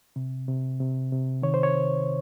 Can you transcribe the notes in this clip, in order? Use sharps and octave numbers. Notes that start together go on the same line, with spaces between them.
C3
C3
C3
C3
D#3 C#5
C5
C#5